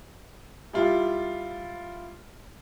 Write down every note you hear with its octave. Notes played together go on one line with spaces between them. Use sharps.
G3 E4 F4